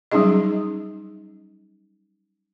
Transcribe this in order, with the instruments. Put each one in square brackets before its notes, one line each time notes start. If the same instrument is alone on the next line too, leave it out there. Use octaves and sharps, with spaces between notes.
[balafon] F#3 G3 C#4 D#4 G#4 D#5